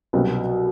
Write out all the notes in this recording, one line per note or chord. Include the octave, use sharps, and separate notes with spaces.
C2 B2 F#3 B3